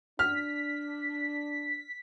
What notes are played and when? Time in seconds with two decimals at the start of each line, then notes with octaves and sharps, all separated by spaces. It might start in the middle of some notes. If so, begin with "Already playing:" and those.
0.19 D4 F6 B6